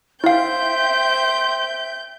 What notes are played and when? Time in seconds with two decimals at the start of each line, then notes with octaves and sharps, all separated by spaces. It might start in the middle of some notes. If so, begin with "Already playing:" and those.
0.24 E4 C5 E5 F5 G5 G6